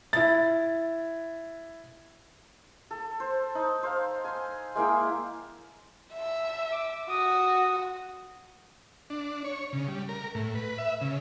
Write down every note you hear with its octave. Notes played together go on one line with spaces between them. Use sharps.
E4 A6
A4
C5
D#4
C5 F5
G#5 C6
G#3 A#3 E4 G5
E5
D6
F#4 D#6
D4
C#5
C#3
G3
A#4
A2
B4
E5
C#3